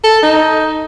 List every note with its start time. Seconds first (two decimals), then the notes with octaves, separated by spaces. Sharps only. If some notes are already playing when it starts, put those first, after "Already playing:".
0.04 A4
0.23 D#4